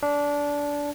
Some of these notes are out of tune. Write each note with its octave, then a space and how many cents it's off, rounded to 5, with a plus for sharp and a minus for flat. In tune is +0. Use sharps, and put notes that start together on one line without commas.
D4 -20